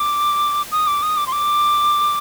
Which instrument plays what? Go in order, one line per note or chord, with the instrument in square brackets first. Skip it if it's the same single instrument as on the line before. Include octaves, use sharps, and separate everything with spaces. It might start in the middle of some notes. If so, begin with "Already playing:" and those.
Already playing: [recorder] D6
D#6
D6
D#6
D6
C6
D6